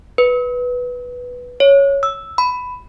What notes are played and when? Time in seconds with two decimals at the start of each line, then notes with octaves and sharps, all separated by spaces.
0.18 B4
1.60 C#5
2.03 E6
2.38 B5